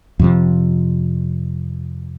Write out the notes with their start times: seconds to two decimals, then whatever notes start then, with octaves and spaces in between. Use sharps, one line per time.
0.19 F2 C3 F3